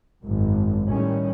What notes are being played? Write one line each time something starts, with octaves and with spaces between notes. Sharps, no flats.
G#1 F#2
A2 D#3 G3 C#4